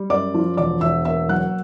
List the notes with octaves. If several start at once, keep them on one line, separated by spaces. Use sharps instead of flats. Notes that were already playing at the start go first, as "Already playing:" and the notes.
Already playing: G3
F#2 D5 D6
F3
E1 D5 D6
E1 E5 E6
A#3 E5 E6
F#3 F#5 F#6